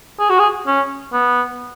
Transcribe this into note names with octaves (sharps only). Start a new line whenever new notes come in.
G#4
F#4
G#4
C#4
B3